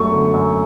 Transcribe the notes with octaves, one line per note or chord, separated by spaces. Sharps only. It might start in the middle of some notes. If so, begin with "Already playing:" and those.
Already playing: F#2 F#3 A3 C#6
D3
F#2